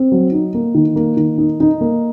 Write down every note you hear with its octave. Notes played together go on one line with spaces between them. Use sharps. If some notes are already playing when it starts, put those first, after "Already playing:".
Already playing: C4
F#3
D#4
A#3
D#3
A#3
D#3
D#4
D#4
A#3